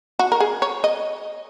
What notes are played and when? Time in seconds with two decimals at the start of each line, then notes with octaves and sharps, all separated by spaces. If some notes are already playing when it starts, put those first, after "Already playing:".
0.19 F#4
0.32 A#4
0.40 G#4
0.62 C#5
0.84 D#5